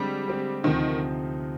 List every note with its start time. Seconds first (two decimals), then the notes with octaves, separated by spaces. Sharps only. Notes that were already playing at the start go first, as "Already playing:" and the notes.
Already playing: D3 G3 G#3 C4 G4
0.27 D3 G#3 C4 G4
0.63 D2 C3 D#3 F3 C4 D#4